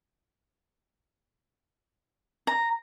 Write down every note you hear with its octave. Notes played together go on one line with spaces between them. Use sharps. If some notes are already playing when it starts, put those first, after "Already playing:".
A#5